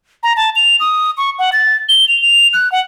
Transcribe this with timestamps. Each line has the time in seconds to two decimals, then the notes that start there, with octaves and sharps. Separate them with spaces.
0.23 A#5
0.37 A5
0.56 F7
0.80 D#6
1.17 C#6
1.39 F#5
1.53 A6
1.89 G7
2.08 F7
2.22 F7
2.53 F#6
2.72 F#5